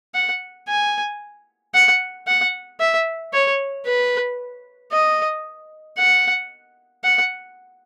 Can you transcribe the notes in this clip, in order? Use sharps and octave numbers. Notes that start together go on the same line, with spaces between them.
F#5
G#5
F#5
F#5
E5
C#5
B4
D#5
F#5
F#5